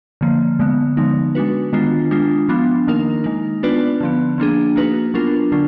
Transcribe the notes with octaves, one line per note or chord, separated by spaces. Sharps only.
D3 F3 A#3
D3 G#3 B3
D3 F3 G#3 B3 D#4
G#3 D4 F#4 B4
D#3 G#3 B3 D4 F4
G#3 D4 F4
F3 B3 D4 F4
D#3 A#3 D#4 A#4
D#3 G#3 D#4
B3 D4 F4 B4 D5
D3 F3 B3
F3 A#3 D4 G#4
A#3 D#4 F#4 B4
F#3 B3 D4 F4 A#4
D3 F#3 D4 F4